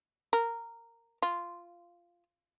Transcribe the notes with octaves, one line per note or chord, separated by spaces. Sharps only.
A#4
F4